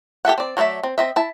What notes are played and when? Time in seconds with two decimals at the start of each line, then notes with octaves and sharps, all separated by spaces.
0.25 G4 A4 E5 F#5
0.38 C4 D5
0.57 F#3 A3 F4 D5 E5
0.83 C4
0.98 C4 D#5 E5
1.16 E4 A5